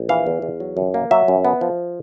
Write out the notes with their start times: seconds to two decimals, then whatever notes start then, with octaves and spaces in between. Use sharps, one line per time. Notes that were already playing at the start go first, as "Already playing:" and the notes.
Already playing: A#1
0.09 E3 F5
0.26 E2
0.42 E2
0.60 F#3
0.77 F#2
0.94 A#3
1.11 F#3 E5
1.28 F#2
1.45 B3
1.61 F3